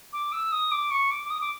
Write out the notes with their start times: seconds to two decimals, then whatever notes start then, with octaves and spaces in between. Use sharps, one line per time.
0.13 D6
0.32 E6
0.52 D#6
0.71 D6
0.91 C#6
1.11 D6
1.25 D6
1.30 D#6
1.41 D6